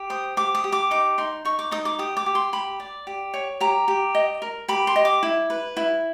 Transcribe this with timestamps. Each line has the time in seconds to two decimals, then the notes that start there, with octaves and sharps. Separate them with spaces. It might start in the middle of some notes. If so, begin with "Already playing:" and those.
Already playing: G4
0.10 C5 D#6
0.37 G4 D6
0.55 D#6
0.64 G4
0.72 D6
0.91 D#4 D6
1.18 D#4 C6
1.45 D#4 C#6
1.59 D6
1.71 D#4 D#6
1.85 D6
1.99 G4 D#6
2.17 D6
2.26 G4
2.35 C6
2.53 G4 B5
2.80 D5
3.07 G4
3.34 C#5
3.61 G4 A#5
3.88 G4
4.15 D#5
4.42 A#4
4.68 G4 B5
4.87 C6
4.96 D#5
5.05 D6
5.23 E4
5.50 B4
5.77 E4